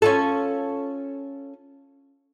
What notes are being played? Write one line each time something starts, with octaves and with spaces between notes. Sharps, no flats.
C#4 F4 A4